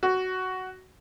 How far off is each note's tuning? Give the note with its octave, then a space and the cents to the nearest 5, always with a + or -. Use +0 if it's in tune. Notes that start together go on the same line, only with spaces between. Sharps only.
F#4 +10